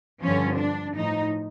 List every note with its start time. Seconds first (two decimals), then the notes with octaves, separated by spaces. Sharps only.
0.23 G2 D3 F3 C#4
0.59 D4
0.97 A2 F3 D#4